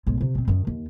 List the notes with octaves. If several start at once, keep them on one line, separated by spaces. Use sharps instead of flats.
B1 G#2
C3
B2 C4
F#2 D#3
D#2